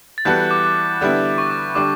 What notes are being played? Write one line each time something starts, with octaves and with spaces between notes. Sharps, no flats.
A6
E3 G3 B3 F#4 A4 G6
F#6
D6
D6
D3 G3 B3 E4
C#6
D6
D3 G3 D4 D6